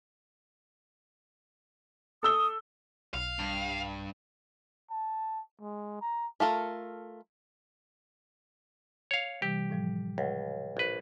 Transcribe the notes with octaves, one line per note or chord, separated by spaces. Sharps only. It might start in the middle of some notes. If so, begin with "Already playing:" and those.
A4 D#6 E6 G7
B1 F5
G2
A5
G#3
A#5
A3 F4 A4 A#4
C#5 F5
C3 E3 G3 G4
A2 F3 G3
C#2 F#5
A#1 B4